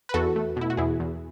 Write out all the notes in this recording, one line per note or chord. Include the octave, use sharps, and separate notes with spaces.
B4
E2 F#4 A4
A3
B2 E4
F#4
E2 E4 G#4
E2